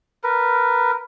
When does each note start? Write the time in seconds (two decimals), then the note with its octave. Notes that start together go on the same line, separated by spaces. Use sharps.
0.24 A#4 B4